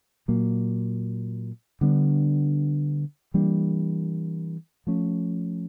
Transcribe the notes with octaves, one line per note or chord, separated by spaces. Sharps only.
A#2 F#3 A#3
D3 G3 B3 D4
E3 G3 A#3 D4
F3 A3 C#4